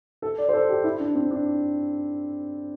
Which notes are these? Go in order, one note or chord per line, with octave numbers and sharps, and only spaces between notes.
A4
D5
C5
A4
G4
E4
D4
C4
D4